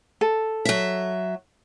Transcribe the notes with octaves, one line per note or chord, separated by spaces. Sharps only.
A4
F#3 E5